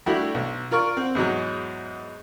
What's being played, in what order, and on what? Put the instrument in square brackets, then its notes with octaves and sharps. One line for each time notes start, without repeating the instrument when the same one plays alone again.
[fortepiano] G3 A3 D4 E4 F#4 G4
B1
F4 A#4 D5 C#6
C4 F#5
E2 G#2 F#3 G#3